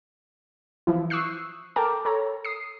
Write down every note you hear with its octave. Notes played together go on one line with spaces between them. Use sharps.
E3 F3 E4
C#6 D#6 E6 F#6 C7
A4 A#4 G5 A5 A#5 D6
A4 C#5 A#5
D#6 C7